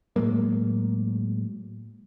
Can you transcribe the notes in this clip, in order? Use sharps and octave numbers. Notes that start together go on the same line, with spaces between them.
A2 F#3 G#3 A#3